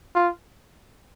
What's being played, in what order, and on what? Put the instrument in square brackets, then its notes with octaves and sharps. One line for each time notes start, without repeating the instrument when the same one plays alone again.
[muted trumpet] F4